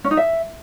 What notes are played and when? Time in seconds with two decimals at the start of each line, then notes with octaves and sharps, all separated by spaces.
0.04 C#4
0.11 D#4
0.17 E5